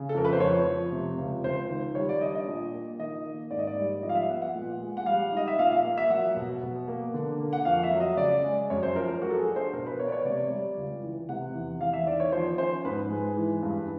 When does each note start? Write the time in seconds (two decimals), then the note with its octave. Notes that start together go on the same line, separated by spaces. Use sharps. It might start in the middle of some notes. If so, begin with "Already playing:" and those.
Already playing: C#3
0.09 A4
0.15 F2 A#4
0.25 B4
0.33 C5
0.40 F2 C#5
0.66 F3
0.92 C3
1.18 C#2
1.44 C#2 C5
1.70 D#3
1.95 G3 C#5
2.09 D5
2.21 D4 D#5
2.35 D#5
2.47 A#2
2.74 A#3
2.99 D#3 D#5
3.25 A#3
3.51 G#2 D5
3.59 D#5
3.67 D5
3.77 G3
4.03 F3 D#5
4.09 F5
4.15 E5
4.29 B3 F#5
4.42 F#5
4.54 A#2
4.81 G#3
4.97 F#5
5.06 G3 F5
5.33 D#4 D#5
5.48 E5
5.59 A#2 F5
5.71 F5
5.84 A#3
5.98 E5
6.10 F#3 F#5
6.36 B2
6.62 B2
6.88 A#3
7.14 D3
7.40 A#3
7.53 F#5
7.65 F2 F5
7.84 E5
7.91 F#3
8.00 D#5
8.17 C#3 D5
8.44 G#3
8.70 F#2 C#5
8.83 C5
8.95 F3 A#4
9.08 A#4
9.21 F#3 F#4
9.30 A4
9.38 G#4
9.47 D4
9.56 C5
9.73 B2 A#4
9.86 B4
9.99 B3 C#5
10.07 D5
10.12 C#5
10.25 C3 D5
10.50 G3
10.77 C#2
11.02 E3
11.29 C3 F#5
11.54 E2
11.80 E2 F5
11.93 E5
12.07 D#3 D5
12.20 C#5
12.32 F3 C5
12.58 C#4 C5
12.85 G#2 B4
13.10 G#3
13.37 E3
13.63 G2